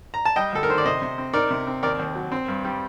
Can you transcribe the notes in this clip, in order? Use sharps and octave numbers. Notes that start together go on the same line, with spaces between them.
A#5
A5
G3 D#5 G5
D2 A4
A#4
D#3 C5
D5
C3 C5 D#5
C3
C4
D#4 A#4 D5
C3
C4
D#2 A#4 D5
D#2
F#3
C4
G2
G3